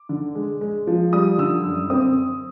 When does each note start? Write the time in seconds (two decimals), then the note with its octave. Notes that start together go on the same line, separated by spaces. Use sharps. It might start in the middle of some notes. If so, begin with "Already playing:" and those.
Already playing: D6
0.09 D3
0.35 G#3
0.61 G#3
0.87 F3
1.13 G3 D#6
1.38 D3 E6
1.64 F#2
1.90 C4 D#6